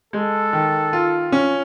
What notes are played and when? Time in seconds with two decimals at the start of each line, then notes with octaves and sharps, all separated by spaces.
0.13 G#3 A4
0.53 D#3
0.93 F4
1.32 C#4